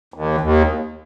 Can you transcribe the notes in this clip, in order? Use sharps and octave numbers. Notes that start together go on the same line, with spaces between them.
D#2
D#2